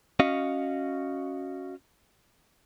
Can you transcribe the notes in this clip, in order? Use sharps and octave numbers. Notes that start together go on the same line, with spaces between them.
C#4 F#4 D#5 F5